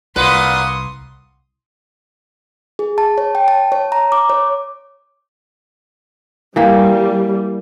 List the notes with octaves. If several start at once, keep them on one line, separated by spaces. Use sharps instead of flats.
C2 A#2 B4 F5 F#5 C6 D#6
G#4
A5
C#5
G5
A5
C#5
A#5
D6
C#5
E3 G3 A#3 G5